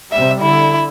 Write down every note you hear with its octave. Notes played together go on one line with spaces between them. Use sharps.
C3 G3 E5
D3 E4